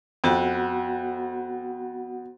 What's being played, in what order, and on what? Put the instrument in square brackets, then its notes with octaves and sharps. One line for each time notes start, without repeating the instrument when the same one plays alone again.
[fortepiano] F2 [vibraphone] B3 F#4 F#5